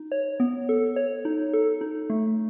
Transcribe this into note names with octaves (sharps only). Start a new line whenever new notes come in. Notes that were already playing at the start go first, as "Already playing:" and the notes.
Already playing: D#4
C#5
B3
A4
C#5
D#4
A4
D#4
A3